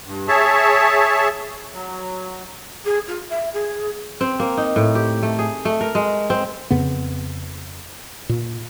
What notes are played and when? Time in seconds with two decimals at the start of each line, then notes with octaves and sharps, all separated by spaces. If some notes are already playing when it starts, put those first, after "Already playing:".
0.05 G2
0.28 G#4 C#5 E5 A5
1.74 F#3
2.85 G#4
3.07 F4
3.29 E5
3.53 G#4
4.21 C4
4.40 A#3
4.57 D#4
4.76 A2
4.95 G4
5.23 A3
5.39 G#4
5.65 A3
5.81 A#4
5.95 G#3
6.30 C4
6.71 F2 C#3 B3
8.29 A#2